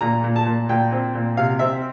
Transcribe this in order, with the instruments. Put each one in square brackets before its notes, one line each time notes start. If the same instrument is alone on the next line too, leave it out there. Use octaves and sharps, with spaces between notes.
[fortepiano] A#2 A#5
A#2
A5
A#2
A#2 G5
C4
A#2
C3 F5
C4 E5